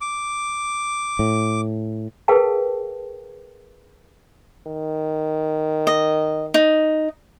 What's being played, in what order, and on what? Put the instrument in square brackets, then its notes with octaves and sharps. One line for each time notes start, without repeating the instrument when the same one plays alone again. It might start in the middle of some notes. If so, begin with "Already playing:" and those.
[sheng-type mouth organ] D6
[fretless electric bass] A2
[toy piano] G#4 A#4 B4 F5 G5 A5
[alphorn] D#3
[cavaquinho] D#5
D#4